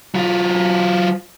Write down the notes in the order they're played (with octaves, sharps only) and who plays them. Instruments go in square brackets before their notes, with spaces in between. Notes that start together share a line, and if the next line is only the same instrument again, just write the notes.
[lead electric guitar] F#3 F4